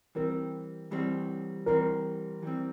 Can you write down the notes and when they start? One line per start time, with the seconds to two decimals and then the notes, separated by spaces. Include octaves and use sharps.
0.15 E3 G3 C4 A#4
0.91 E3 G3 C4
1.66 E3 G3 C4 A#4
2.43 E3 G3 C4